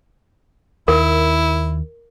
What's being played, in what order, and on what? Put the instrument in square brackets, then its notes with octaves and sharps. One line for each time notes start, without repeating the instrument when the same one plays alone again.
[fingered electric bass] D#2 [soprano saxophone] E4 [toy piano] A#4